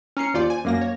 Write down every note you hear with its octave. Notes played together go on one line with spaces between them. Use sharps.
C#4 A#5 C7 C#7
D#2 F4 C5 D5
G#5
F#2 A#3 A#6
C#5